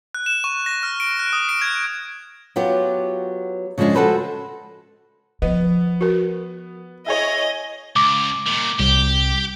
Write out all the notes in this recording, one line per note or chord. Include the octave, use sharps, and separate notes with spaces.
F#6
E7
C#6
A#6
F6
D7
F#6
D#6
D7
G#6
F#3 B3 F4 G4
C#3 F3 G3 G#3 D4
F#4 G4 A4 B4 C5
F3 B3 D#5
F#4 A#4
E4 G#4 C#5 D#5
C#2 D6
A#2 D#3
C2 G4